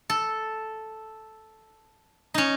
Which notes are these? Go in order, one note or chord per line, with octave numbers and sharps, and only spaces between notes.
A4
C#4 D#4